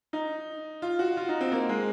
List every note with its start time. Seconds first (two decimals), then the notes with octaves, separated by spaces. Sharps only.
0.13 D#4
0.82 F4
0.99 F#4
1.17 F4
1.29 D#4
1.41 C4
1.52 A#3
1.69 G#3